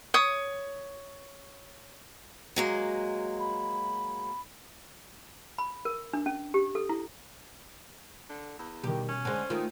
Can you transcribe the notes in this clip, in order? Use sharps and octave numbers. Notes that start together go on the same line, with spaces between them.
C#5 D#6
F#3 G#3 A#3
B5
B5
A#4
D4
C#4
G4
A4
E4
D3
E2
B2 D#3 G3 G4
C#4
D3 G#3 C5 G#5
D#3 A3 F4